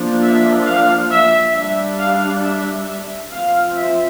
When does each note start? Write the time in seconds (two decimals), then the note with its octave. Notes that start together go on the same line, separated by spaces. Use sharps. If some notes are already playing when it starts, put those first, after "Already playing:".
Already playing: F3 A#3 D4
0.24 E5
0.67 F5
1.11 E5
1.55 G3 D4 E5
1.99 F5
2.43 E5
2.87 E5
3.31 F3 C4 F5
3.75 E5